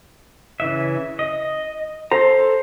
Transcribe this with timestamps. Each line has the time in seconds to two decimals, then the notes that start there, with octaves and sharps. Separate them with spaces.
0.60 C#3 E3 E5
1.19 D#5
2.12 A4 C5 A#5